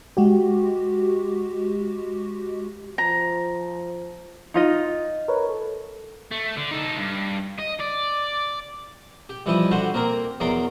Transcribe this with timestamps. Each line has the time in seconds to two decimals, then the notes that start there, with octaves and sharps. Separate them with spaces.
0.17 G#3 F#4 G4
2.98 F3 A#5
4.54 D#4 F4 D#5
5.28 A#4 B4 C#5
5.49 A4
6.31 A3
6.57 D3
6.71 D#4 A4
6.98 G2
7.59 D#5
7.80 D5
9.29 G4
9.46 G2 E3 F3 E4 D#5
9.71 D3 F#4 G4 C5
9.94 A#3 C4 G4 A#4
10.40 E2 F#3 A#4 D5 C6 D6